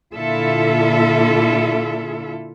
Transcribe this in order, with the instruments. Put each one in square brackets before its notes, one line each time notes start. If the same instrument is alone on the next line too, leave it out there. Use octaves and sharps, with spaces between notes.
[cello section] A#2 D3 E4 F4 A4 E5